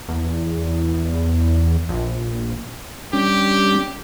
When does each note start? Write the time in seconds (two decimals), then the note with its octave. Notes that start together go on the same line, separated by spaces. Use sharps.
0.08 E2
1.89 A#1
3.13 G3 C#4 D4 G4